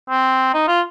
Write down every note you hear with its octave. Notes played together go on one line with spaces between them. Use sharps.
C4
D#4
F4